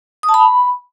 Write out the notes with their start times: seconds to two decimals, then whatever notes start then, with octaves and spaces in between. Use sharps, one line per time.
0.23 D#6
0.29 A5
0.34 B5